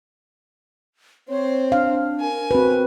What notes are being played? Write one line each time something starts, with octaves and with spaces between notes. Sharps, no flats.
C4 C5 C#5
D4 F5
A#4 G#5
C4 F#4 B4